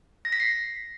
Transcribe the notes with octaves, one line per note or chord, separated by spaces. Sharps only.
A#6
B6
C7